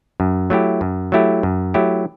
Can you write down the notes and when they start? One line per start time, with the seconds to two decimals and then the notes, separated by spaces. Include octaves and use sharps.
0.20 F#2
0.50 F#3 A3 E4 G4
0.81 F#2
1.12 F#3 A3 E4 G4
1.43 F#2
1.74 F#3 A3 E4 G4